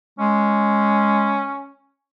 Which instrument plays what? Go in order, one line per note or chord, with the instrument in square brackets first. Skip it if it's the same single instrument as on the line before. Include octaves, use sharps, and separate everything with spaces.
[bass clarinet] G#3 [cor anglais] C#4